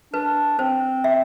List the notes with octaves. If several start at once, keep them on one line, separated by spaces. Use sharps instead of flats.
D4 B4
C4 C5
E5